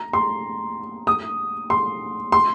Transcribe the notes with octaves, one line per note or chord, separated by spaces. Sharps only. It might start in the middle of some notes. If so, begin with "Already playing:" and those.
Already playing: A#5
C6
D#6
C6
C6